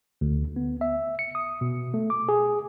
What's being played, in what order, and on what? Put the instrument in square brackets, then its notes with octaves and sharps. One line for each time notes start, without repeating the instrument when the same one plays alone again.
[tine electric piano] D2
B3
E5
C#7
D#6
B2
A3
D6
G#4